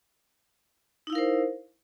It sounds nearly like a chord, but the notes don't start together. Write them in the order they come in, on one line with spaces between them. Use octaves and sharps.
D#4 E4 F5 A#4 C5